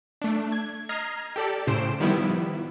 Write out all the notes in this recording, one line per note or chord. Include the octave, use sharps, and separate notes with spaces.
A3 D4
G#6
D#5 A#5 F6 G#6 C7
G4 A4 D5
A2 C#3 C5 D7 E7
D#3 F3 G3 B3 E4